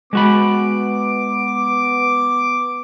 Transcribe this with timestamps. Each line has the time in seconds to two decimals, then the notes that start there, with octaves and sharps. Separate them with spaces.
0.13 G#3 B3 F#4 B5 D6